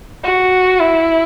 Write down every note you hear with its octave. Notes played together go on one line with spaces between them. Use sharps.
F#4
E4